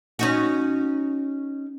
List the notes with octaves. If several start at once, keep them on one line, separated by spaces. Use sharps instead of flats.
C#4 D#4 F#4